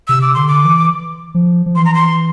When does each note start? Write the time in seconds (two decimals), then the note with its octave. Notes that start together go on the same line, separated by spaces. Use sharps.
0.08 C3 E6
0.22 D6
0.34 D3 C6
0.48 D6
0.65 E3
1.34 F3
1.66 F3
1.76 E3 C6
1.85 A#5
1.94 C6